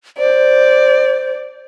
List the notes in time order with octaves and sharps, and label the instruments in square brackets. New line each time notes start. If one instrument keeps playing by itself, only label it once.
[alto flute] C5 [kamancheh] D5